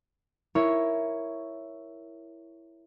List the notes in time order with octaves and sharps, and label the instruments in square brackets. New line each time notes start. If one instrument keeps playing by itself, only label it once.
[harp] E4 A#4 C#5